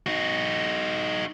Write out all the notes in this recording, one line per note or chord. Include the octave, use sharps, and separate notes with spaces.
D#4 F#4